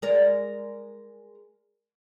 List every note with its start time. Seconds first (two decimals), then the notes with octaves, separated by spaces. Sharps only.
0.02 G#3 A#4 D5